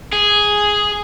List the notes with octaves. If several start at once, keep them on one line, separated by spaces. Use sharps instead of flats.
G#4